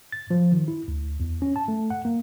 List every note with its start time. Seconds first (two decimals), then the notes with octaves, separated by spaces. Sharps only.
0.12 A6
0.31 F3
0.52 D#3
0.68 E4
0.88 D2
1.20 E2
1.42 C#4
1.56 A5
1.68 A3
1.90 F#5
2.05 A#3